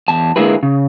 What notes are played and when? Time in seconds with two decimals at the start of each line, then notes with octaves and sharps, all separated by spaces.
0.08 E2 A5
0.36 D3 G#3 A#3 E4 G#4 B4
0.63 C#3